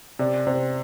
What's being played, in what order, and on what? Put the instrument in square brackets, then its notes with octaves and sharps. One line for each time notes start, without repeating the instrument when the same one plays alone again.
[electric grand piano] C3 [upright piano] D5
[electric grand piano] C3 [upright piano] C5